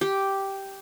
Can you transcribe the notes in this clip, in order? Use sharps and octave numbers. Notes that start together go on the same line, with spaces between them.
G4